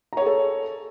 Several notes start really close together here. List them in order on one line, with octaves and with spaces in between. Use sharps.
A#5 C#5 G#4 A4